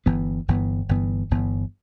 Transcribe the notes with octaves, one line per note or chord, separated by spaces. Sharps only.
G1 G2 E3 B3
G1 G2 E3 B3
G1 G2 E3 B3
G1 G2 E3 B3